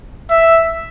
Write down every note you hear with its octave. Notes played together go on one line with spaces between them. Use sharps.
E5